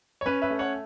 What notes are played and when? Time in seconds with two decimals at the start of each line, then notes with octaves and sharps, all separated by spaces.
0.21 C#5
0.26 C#4 B4
0.42 B4 E5
0.50 A3
0.59 C#5 F#5